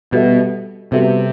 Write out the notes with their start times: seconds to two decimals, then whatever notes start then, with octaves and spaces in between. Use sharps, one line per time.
0.12 B2 G3 B3 F#4 A4 E5
0.92 C3 G3 B3 F#4 A4 E5